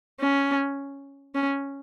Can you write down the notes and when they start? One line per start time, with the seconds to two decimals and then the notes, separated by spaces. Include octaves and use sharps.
0.20 C#4
1.35 C#4